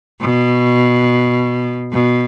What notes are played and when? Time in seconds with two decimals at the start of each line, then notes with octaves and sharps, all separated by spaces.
0.21 B2
1.93 B2